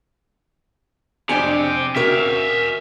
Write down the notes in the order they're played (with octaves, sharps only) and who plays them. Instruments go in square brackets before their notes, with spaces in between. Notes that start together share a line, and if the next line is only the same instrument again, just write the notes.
[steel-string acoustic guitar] F2 D4 G#5 [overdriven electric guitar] C3 G4
[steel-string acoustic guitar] C#4 F#4 A#4 [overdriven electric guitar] E5 F5